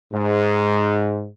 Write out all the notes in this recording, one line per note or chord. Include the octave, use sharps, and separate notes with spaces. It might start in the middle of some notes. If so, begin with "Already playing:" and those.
G#2